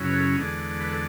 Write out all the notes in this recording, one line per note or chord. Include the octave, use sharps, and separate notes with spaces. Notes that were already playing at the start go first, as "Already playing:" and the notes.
Already playing: F#2 C#3 F#3 C#4 E4
B4
A4
E2 D3 G#3 D4 G#4
B4
A4